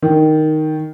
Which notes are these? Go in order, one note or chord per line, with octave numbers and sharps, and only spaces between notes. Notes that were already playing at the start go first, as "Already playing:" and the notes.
D#3